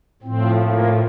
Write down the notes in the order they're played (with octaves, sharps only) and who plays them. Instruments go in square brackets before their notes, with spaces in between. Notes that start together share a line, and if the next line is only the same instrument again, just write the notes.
[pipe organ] A2 F3 C4
A#3